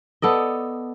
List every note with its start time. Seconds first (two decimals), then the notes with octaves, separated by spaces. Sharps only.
0.22 B3 A4 D5 D#5